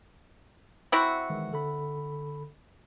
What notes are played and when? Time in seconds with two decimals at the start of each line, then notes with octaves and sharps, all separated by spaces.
0.92 C4 E4 F#4
1.30 D#3 E3 G#3
1.52 D3 A4 B5